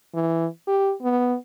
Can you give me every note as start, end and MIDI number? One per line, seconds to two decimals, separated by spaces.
0.14 0.46 52
0.67 0.93 67
1.02 1.36 59